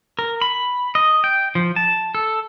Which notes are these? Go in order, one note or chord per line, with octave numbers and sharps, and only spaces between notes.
A#4
B5
D#5
G5
F3
A5
A4